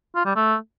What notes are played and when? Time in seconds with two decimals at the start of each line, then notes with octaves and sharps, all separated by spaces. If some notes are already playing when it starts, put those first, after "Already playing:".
0.16 F4
0.26 G3
0.36 A3